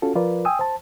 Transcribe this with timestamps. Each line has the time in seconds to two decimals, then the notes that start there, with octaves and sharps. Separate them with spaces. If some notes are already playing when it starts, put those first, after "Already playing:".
0.02 C#4 F4 F#4 A4
0.15 F3 F4 A#4 B4 D5
0.45 G5 G#5 D#6 E6
0.59 C5 A5